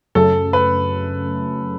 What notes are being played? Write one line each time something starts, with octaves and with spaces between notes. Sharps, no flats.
F#2 C#3 F#3 A3 C#4 A4
B4